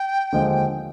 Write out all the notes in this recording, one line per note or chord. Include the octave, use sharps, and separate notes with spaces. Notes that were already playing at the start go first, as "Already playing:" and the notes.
Already playing: G5
D#2 D3 F3 G#3